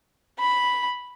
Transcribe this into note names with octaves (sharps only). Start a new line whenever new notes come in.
B5